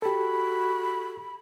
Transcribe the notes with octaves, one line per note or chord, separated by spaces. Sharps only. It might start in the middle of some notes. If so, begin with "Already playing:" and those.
F#4 G4 A4 B5